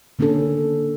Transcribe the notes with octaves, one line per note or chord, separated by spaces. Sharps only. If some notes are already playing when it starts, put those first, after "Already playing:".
D3 A#3 C#4 D4 A4